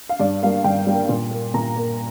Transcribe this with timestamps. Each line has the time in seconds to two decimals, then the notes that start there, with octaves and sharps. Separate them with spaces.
0.09 F5
0.20 G2 D5
0.42 G3 A#3 F5
0.64 G2 G5
0.87 G3 A#3
1.09 A#2
1.31 A#3
1.54 A#2 A#5
1.76 A#3